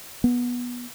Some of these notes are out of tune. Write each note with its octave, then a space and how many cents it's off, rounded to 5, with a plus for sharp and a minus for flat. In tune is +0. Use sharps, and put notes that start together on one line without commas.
B3 -15